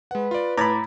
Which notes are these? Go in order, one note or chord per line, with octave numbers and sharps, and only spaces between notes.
G#3 B4 F#5
F4 D5
A2 A#5 B5 D6 G#6 A6